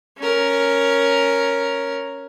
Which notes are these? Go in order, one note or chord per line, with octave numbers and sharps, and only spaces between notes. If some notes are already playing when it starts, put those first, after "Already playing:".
C#4 A#4